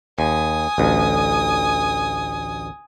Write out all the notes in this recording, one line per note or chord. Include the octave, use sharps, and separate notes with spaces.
D#2 G#5 D#6
A1 D2